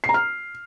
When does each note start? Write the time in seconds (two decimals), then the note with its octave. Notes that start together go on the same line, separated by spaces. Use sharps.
0.04 C7
0.09 A#5
0.14 F6